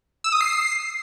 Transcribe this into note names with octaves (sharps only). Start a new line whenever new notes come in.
E6
D#6
C7